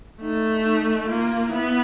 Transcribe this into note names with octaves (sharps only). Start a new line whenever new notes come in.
A3 D#4
D#4
A#3 F4
B3 E4